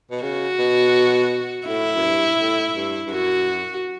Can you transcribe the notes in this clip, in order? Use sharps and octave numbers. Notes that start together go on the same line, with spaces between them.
B2
C#3 F#4
B2
A2 E4
F#2
G2
A2
G2
G2
F#2 F#4